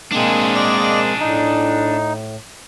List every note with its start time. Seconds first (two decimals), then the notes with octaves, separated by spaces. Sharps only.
0.12 G#3 A#3 C4 D4 G#4
0.55 D5 D#5
1.21 A2 D#4